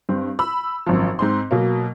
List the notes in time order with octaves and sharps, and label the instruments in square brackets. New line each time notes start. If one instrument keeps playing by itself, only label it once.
[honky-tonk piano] G2 C4
B5 E6
G#1 F#2 F3
G#2 C4 C6
B2 F#3 A#3